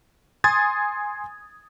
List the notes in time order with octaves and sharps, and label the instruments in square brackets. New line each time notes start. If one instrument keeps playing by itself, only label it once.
[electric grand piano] G#5 C6 D#6 G#6 A6